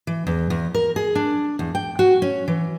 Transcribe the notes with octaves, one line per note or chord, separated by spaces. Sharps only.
E3
E2
E2
A#4
G#4
D4
E2
G5
F#4
C#4
E3